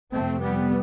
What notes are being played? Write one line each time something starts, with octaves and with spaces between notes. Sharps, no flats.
F2 C3 A3 C4
G3 B3